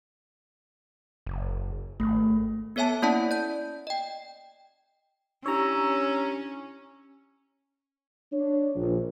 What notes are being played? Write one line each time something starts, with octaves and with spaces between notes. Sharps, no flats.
F#1
G#1 A3
B3 A4 C#5 E5 G#5 A5
A#3 C#4 E4 D5 F#5 A5
D5 G6
D#5 G5
C#4 D4 E4 G4 C#5 A#5 E6
D4 C#5
A#1